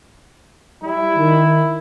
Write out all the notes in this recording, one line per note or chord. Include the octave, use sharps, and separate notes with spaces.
G3 E4
D#3